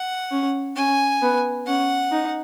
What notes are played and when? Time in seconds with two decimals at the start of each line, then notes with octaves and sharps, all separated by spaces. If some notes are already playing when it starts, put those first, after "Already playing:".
Already playing: F#5
0.31 C#4
0.76 C#4 G#5
1.22 B3
1.66 C#4 F#5
2.12 D#4